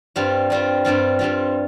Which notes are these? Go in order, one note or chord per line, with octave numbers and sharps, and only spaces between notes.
G2 G3 C4 F4
G2 G3 C4 F4
G2 G3 C4 F4
G2 G3 C4 F4